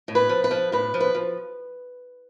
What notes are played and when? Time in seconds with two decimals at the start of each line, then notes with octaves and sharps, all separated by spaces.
0.08 A2
0.15 B4
0.29 F3
0.44 B4
0.51 F3
0.72 A2 B4
0.94 F3
1.00 B4
1.15 F3